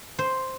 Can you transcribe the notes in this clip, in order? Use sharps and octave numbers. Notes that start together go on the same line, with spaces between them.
C5